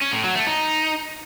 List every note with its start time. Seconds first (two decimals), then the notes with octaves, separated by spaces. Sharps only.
0.02 C#4
0.13 A2
0.24 F#3
0.35 A3
0.47 D#4